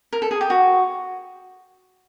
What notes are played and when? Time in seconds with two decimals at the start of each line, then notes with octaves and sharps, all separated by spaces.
0.13 A#4
0.22 A4
0.31 G#4
0.41 G4
0.50 F#4